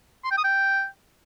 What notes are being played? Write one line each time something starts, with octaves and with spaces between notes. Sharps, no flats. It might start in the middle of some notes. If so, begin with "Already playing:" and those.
C6
G5
D#6
G5